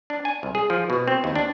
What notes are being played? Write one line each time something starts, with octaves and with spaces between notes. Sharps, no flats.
D4
G#5
C2
G#4
F3
B2
C4
D#2
D4